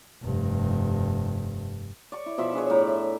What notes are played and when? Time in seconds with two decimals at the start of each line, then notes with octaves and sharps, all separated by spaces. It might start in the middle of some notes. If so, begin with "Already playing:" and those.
0.23 F1 G2
2.12 D5 C#6
2.26 E4
2.38 B2 F3 E5 B5
2.54 D4 G#4 B4 C#5
2.70 A2 A#5 B5 D6
2.88 E5